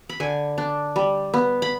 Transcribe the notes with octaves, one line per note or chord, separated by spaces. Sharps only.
B5
D3 G#5
D4
G3
B3
B5